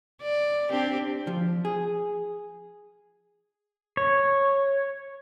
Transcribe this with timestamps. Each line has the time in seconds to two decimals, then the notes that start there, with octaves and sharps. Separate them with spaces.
0.22 D5
0.70 C4 D4 G4
1.27 F3
1.65 G#4
3.97 C#5